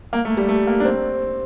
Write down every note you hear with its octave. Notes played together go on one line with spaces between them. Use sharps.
A#3
A3
G3
A3
A#3
D4
C4